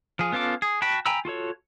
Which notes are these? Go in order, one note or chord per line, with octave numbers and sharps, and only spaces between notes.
F3 G#4
B3 C#4 F4 A4 D6
G#4
F#4 G5 A5 B5
G5 G#5 A#5 B5 E6
F4 F#4 A4 C#5